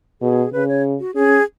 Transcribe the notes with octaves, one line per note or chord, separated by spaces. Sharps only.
B2 G#4
C#3 B4
C#5
F#4
C#4 G#4